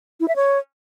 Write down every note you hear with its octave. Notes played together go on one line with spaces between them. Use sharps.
E4
E5
C#5